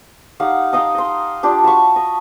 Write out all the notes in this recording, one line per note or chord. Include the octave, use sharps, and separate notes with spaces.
D#4 G4 F5 F#5
D#4 D#5 F5 G5
D#5 C6
D4 F4 G4
F#4 A5 B5 C#6
D#5